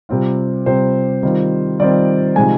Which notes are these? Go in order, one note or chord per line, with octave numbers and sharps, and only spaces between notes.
C3 G3 C4 F4
C3 G3 C4 F4 C5
D#3 G3 C4 F4
D#3 G3 C4 F4 D5
C3 F3 G#3 D#4 G#5